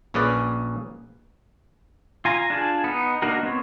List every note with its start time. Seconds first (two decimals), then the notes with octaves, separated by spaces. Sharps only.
0.14 A#1 A#2 C#4 G#4 B4 D5
2.25 F4 G#5 A#5
2.50 D4 F4 G#4 G#5 A5
2.84 B3 D#4
3.22 A#3 D4 D#4 F#4 A#4
3.43 B3 C4 C#5